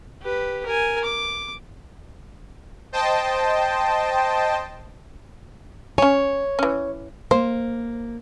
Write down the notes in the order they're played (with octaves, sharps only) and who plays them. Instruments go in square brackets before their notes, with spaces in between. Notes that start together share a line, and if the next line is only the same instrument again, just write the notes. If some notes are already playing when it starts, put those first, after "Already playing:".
[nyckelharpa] G4 B4
A#4 G#5
D6
[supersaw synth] C5 D#5 G5 A5
[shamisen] C#4 G#5 [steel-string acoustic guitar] C#5
[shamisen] E3 C#4
[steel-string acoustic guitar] A#3 [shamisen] C5